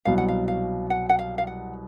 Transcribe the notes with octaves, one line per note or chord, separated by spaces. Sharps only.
C2 B2 F#3 F5
F#5
F5
F5
F#5
F#5
F5
F5
F#5